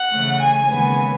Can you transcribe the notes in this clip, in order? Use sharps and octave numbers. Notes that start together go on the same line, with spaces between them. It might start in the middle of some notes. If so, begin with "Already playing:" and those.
Already playing: F#5
C#3 E3 A3
G#5
D#2 C#3 E3 G#3 B3